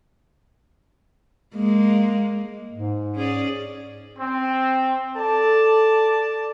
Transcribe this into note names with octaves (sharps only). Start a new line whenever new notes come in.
G#3 A#3
G#2
C#4 G#4 D5
C4
A4 D5 A5